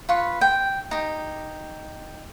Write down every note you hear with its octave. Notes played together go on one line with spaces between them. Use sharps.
F4 B4 C#6
G5
D#4 G4